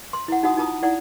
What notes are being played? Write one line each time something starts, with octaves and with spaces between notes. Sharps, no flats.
C6
E4 F#5
D#4 F#4 F#5 D#6
D#4 F4 A5 A#5 D#6
E4 D5 F#5